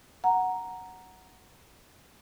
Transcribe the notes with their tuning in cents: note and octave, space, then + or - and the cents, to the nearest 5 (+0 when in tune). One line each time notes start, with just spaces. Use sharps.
F#5 +0 A#5 +0